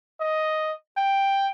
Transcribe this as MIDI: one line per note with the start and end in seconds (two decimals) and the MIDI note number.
0.21 0.73 75
0.97 1.51 79